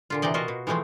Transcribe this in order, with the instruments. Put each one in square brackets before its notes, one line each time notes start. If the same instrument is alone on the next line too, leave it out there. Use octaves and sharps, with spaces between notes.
[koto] A#2 D3 F4
C3 E3 G4 D5 D#5
B2 F4 F#4 A#4 D#5
B2
E3 F3 G#3 A3 C4